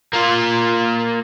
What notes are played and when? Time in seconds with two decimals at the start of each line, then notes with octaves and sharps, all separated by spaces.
0.13 A#3 F4